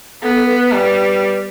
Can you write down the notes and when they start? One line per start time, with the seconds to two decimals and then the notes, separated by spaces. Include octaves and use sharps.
0.22 B3 A4
0.35 A4
0.47 B4
0.60 B4
0.72 G3